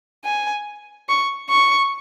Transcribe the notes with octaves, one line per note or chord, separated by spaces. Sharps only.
G#5
C#6
C#6